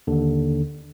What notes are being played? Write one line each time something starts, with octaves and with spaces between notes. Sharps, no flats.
D#2 D3